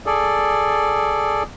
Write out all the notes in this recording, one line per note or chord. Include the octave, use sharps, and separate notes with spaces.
G#4 A4 D5